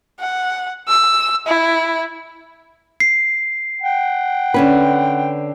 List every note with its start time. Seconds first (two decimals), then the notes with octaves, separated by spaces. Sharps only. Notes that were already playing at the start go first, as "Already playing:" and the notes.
0.20 F#5
0.88 E6
1.47 E4
3.00 C7
3.82 F#5 G5
4.54 D3 C#4 B4